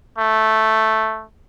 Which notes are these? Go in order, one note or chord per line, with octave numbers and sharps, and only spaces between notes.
A3